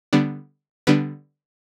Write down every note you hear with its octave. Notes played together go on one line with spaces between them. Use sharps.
D3 G3 B3 D4
D3 G3 B3 D4 B4